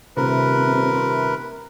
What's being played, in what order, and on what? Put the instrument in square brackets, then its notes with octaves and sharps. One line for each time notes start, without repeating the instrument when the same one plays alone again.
[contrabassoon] D#1 [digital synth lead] C3 [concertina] A#4 B4